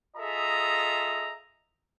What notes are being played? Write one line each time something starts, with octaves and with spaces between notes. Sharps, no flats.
F4 G#4 A4 D#5 E5 A#5